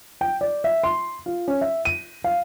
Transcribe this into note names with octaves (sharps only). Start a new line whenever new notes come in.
G5
D5
E5
C6
F4
C#4
E5
D#7
F5